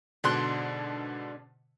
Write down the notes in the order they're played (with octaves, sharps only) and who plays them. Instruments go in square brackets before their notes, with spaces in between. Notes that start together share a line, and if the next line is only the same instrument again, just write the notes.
[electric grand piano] G#2 B2 D3 [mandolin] D4 C6 F#6